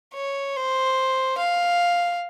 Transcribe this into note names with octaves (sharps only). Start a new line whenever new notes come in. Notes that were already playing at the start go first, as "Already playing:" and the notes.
C#5
C5
F5